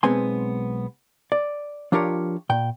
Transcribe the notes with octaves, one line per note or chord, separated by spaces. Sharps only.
B1 G#3 B3 C4 G#5 C6
D5
F3 D4 F4 G4 A#4 C#5
A#2 G5